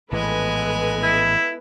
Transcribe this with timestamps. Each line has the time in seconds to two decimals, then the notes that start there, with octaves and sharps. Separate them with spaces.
0.12 A#1 A2 E3 G#3 B3 A4 B4 G#5
1.03 E4